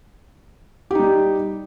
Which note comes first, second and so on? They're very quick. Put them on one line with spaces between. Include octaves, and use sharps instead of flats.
G4 D#4 G3